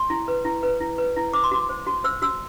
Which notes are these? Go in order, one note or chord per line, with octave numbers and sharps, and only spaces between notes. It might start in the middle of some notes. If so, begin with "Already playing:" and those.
Already playing: C6
E4
B4
E4
B4
E4
B4
E4
C5 D6
C6
F#4 D6
C5
F#4
C5 E6
F#4 E6